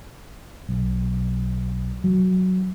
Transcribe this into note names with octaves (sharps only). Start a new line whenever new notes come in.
B1
F#3